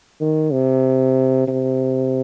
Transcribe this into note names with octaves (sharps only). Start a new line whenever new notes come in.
D#3
C3
C3